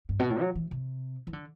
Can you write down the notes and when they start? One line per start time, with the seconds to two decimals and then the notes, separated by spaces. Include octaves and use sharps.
0.09 G2
0.19 B2
0.30 A2
0.40 F#3
0.55 E3
0.71 C3
1.27 E3
1.33 D3